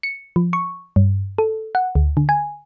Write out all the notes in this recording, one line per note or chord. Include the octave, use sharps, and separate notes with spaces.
C#7
F3
C#6
G2
A4
F#5
D2
D3
G#5